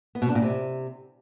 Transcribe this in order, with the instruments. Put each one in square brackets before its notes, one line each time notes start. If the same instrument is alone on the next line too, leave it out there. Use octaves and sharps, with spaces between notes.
[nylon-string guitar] B3
B2
D4
A#2
C3